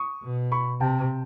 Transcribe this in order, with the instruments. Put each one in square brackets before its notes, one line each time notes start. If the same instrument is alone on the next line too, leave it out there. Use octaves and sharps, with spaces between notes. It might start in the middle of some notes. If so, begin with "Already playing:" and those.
Already playing: [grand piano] C#6 D#6
[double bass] B2
[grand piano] B5 C#6
[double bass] C3 [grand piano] G5 A5